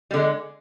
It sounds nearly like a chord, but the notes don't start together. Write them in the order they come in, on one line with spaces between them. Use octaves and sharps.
G3 D3 G#3